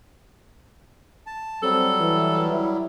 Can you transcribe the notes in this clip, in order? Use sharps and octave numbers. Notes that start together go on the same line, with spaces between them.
A5
F#3 G3 C4 A4
E3
E4